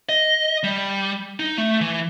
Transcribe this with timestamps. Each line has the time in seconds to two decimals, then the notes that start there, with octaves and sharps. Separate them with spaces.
0.09 D#5
0.63 G3
1.40 D#4
1.58 A3
1.81 E3